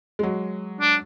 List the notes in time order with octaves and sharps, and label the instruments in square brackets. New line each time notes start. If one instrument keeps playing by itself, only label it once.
[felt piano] F#3 G#3
[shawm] D4